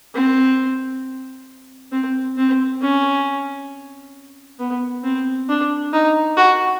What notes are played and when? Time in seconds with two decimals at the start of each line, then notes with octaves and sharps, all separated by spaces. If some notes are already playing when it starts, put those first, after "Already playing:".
0.14 C4
1.92 C4
2.37 C4
2.81 C#4
4.59 B3
5.03 C4
5.49 D4
5.93 D#4
6.37 F#4